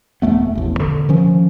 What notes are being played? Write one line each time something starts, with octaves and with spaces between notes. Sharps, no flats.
E1 F#2 A3 B3
E1 A1
D3
D#3 F3 C#4